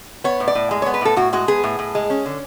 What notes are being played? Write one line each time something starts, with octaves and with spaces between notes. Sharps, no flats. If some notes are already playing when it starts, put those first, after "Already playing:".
B3 C#5
A2
D5
A2
G#3
C#5
B3
B4
A2 A4
A2 F#4
G#3 F#4
B3 G#4
A2
A2
G#3
C#4
D3